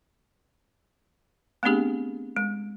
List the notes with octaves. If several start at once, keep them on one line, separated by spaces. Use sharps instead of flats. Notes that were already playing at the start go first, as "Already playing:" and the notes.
A3 B3 C4 D4 G4 G#4
G#3